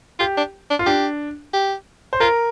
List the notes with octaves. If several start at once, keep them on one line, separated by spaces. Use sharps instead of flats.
F4 G4
D4
D4
F4
D4 G4
G4
C5
F4 A#4